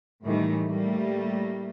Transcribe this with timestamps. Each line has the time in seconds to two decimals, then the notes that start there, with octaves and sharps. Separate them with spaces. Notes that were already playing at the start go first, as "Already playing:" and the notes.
0.23 A2 D#3 E3 G3 A3
0.69 A2 G3 A3 A#3